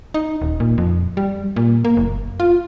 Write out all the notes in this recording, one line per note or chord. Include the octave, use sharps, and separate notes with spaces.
D#4
D#1
A#2
F2
G3
A#2
A#3
F#1
F4